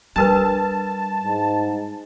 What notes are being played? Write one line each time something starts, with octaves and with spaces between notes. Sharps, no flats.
G3 D4 A#4 B4 A5
G#2